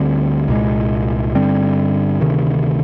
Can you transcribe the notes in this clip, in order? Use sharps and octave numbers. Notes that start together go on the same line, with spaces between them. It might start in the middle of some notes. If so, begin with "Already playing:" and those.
Already playing: D2 D3 G3 C4
C2 A#2 G#3
G2 D3 G3 C4
D2 C3 D#3